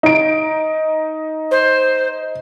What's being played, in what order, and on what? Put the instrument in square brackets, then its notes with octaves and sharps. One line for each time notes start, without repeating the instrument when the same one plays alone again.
[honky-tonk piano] D#4 D7
[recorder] C5